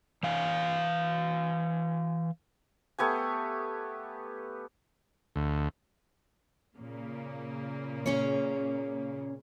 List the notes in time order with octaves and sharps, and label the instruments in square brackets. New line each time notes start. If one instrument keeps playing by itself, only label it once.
[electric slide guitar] E3 F5 G#5
[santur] A3 B3 G4 G#5
[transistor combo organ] D2
[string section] A#2 C#3 A#3
[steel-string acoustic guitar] C#4 G#4 C#5